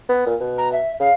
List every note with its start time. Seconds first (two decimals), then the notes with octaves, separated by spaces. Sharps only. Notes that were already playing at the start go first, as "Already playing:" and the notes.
0.09 B3
0.26 A#2
0.40 B2
0.58 A#5
0.73 E5
1.00 C#3 F5